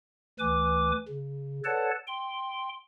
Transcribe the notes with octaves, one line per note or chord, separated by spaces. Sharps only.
D2 E3 B4 G#5 D6
C#3
A4 B4 C#5 D5 F#5 A5
G5 C6